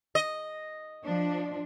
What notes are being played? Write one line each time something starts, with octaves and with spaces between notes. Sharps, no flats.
D#5
F3 D4